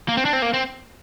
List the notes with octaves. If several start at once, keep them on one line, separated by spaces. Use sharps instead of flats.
A#3
C4
D4
C4
A#3
C4